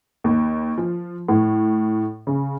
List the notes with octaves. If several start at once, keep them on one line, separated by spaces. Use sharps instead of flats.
D#2
F3
A2
C#3